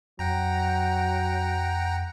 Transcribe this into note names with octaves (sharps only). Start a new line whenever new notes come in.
F2 F#3 F#5 G5 A#5